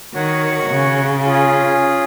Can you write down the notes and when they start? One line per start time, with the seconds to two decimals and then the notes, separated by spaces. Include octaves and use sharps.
0.14 D#3 F#4 C#5 F#5
0.70 C#3
1.24 C#4 F4 G#4